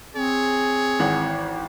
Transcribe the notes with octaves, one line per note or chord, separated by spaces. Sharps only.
C4 G#4 C#5
G#1 E3 F#5